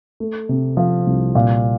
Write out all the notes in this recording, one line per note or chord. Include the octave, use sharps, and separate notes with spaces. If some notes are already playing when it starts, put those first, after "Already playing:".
A3
C3
F3
C2
A#2